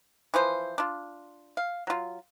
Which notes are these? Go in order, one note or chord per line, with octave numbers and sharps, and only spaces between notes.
E3 F3 C5
D4 F4
F5
F#3 F4